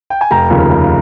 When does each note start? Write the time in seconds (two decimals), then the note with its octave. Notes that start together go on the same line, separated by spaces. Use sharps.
0.10 G5
0.21 G#5
0.31 F1 G5 A#5
0.50 D#2 C#3 F3 A#3
0.70 F1